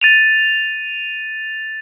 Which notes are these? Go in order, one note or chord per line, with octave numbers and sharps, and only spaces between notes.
A6 D#7 F7